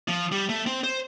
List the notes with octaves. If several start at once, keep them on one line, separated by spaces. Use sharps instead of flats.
F3
G3
A3
C4
C5